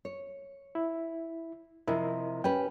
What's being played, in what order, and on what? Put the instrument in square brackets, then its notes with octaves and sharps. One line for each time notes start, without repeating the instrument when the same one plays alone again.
[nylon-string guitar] C#5
[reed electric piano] E4
[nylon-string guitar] C3 F3 [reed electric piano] E4 A#4 D#5
[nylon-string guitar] C#4 G4 B4 [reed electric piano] G5